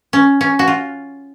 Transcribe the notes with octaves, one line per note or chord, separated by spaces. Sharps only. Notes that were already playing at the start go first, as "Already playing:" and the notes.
C#4
C#4
F#4
F4